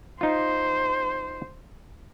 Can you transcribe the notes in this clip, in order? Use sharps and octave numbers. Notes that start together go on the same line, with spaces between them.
D#4 F4 C5